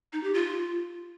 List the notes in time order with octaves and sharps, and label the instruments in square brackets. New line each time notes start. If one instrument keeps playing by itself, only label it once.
[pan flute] D#4
G4
F4